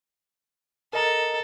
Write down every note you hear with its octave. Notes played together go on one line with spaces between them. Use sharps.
A4 A#4 D#5 A#5